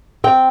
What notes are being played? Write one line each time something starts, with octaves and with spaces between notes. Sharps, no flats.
C4 G5